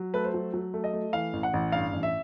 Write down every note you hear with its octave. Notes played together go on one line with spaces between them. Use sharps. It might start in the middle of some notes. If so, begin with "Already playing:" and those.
Already playing: F#3
A3 B4
C5
F#3
F#3
A3
D#5
A3
E3 F5
A1
F#5
A1
G2 F5
A1
E5